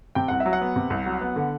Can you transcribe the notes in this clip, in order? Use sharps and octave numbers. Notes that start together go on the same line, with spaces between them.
C3 G5
C2 F#5
E5
F#3
F#5
B3
C3
C2
F#3
B3
D3